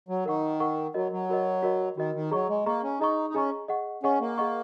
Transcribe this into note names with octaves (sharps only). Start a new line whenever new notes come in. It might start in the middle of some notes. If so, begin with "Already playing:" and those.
F#3
D#3 A#4 F#5 C#6
A#4 F#5 C#6
F#3 F#4 A#4 D#5
F#3
F#4 A#4 D#5
F#4 A#4 D#5
D#3 F#4 A#4 D#5
D#3
F#3 G#4 D#5 A#5 C#6
G#3
A#3 G#4 D#5 A#5 C#6
C#4
D#4 G#4 D#5 A#5 C#6
D#4
C#4 G#4 D#5 A#5 C#6
G#4 D#5 F#5 C#6
C#4 G#4 D#5 F#5 C#6
A#3
G#4 D#5 F#5 C#6